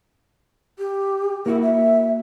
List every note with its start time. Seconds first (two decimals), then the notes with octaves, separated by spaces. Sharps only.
0.79 G4
1.46 A#3 E4 F#4
1.62 E5